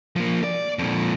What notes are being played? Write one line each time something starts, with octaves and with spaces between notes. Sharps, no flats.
F3 A#3
D5
F2 A#2